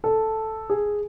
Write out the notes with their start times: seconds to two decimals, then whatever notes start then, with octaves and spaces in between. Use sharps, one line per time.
0.04 A4
0.70 G#4